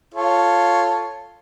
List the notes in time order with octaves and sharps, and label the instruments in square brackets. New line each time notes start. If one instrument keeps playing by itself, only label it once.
[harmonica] F4 A4 C#5